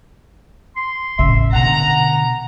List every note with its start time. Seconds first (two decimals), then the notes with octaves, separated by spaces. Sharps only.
0.76 C6
1.19 A1 C#3 E5
1.53 B2 D3 F#5 A#5